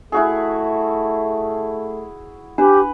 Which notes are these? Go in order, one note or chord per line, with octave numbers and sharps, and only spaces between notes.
A3 E4 F#4 G#4
D4 G4 B4